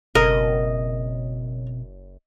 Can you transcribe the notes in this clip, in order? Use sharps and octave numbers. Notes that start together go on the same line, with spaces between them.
F#1 B2 C4 A#4 D#5